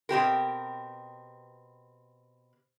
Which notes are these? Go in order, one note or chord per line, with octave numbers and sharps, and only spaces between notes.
B2 C4 G4 A#4